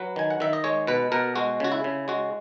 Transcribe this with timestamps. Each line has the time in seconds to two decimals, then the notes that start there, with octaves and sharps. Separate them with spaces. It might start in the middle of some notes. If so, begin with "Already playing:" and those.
Already playing: F#3 B4
0.16 D#3 G#5
0.30 F#5
0.40 D#3 E5
0.53 D#5
0.64 G#3 C#5
0.87 B2 B4
1.12 B2 A#4
1.36 G#3 F#4
1.60 C#3 F#4
1.72 E4
1.84 C#3
2.08 G#3 F#4